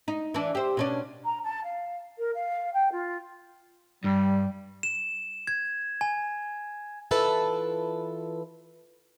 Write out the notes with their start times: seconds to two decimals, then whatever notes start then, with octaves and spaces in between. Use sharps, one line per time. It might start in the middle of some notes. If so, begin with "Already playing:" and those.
0.08 D#4
0.34 E3 D4
0.55 G4 C5
0.77 B2 C#4 D4
1.24 A#5
1.43 A5
1.64 F5
2.18 A#4
2.34 F5
2.73 G5
2.92 F4
4.04 G2 G3
4.83 E7
5.47 G#6
6.01 G#5
7.11 E3 E4 F4 A4 B4 A5